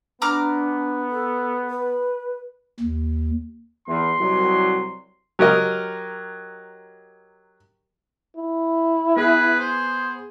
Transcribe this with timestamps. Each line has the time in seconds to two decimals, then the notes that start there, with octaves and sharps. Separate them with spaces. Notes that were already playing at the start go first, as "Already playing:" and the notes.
0.22 B3 D4 A#5 D6 F6
1.11 A4
1.70 B4
2.80 D#2
3.88 E2 C6
4.19 C2 F#3
5.39 F#3 G4 A#4 D#5
8.36 E4
9.16 B3 G#4 B4
9.59 C5